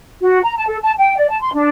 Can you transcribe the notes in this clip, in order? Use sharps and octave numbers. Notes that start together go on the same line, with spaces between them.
F#4
A#5
A5
A4
A5
G5
D5
A5
C6
D4